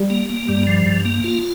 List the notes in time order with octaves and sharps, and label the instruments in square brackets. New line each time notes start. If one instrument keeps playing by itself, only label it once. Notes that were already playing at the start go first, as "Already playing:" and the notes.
Already playing: [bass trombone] G3
[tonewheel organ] A#3
A#3
[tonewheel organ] G2 [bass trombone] G3
[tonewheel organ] F3
G2
A#3
F4